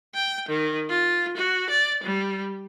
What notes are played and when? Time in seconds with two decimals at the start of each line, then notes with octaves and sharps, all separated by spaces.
0.15 G5
0.49 D#3
0.90 F4
1.37 F#4
1.70 D5
2.04 G3